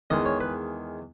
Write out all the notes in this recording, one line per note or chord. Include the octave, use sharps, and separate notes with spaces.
E2 D#3 G#3 D#5
C#5
B4